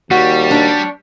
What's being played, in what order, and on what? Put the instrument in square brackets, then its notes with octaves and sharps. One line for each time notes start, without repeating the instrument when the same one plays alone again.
[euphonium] D#2 [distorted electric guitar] G3 [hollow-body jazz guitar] F#4
[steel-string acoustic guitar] D4 C#5